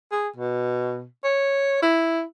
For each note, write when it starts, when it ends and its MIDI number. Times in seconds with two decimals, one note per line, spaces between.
0.11 0.28 68
0.36 1.05 47
1.24 1.78 73
1.82 2.22 64